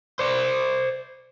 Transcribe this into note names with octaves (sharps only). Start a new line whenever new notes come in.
C5 D5